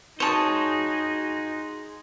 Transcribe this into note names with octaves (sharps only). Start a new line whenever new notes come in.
D#4 F#4 G#4 C5 C#5 A5